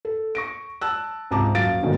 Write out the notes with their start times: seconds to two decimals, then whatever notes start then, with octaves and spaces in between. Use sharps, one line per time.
0.05 A4
0.35 C#6 A#6 D7
0.81 A5 E6 F#6
1.31 C#2 G#2 C3 A5 A#5 D6
1.55 D#1 F#2 F5 A6 D7
1.83 D2 G#2 B2 D3 D#3